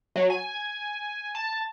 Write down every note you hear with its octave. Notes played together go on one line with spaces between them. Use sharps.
F#3
G#5
A5